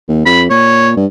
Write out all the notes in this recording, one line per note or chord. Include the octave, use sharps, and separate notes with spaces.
D#2
F2 B5
A#2 C#5
G2